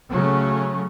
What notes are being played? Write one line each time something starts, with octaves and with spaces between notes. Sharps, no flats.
C#3 F#3 A3 C#4